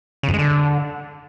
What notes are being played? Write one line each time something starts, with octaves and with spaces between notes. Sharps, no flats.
C#3
F2
G#3
D3